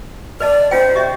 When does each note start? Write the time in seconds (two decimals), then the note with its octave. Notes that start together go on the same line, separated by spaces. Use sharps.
0.40 B4 D5 D#5 A5
0.71 C#4 F4 C5 G5
0.96 G4 D#5 E5